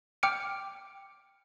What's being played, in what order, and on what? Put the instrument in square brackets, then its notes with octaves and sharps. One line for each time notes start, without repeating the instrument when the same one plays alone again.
[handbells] G5 D6 F6 C#7 D7